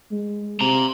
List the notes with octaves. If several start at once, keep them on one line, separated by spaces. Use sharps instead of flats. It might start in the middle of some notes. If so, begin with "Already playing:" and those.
G#3
C3 A#5 C6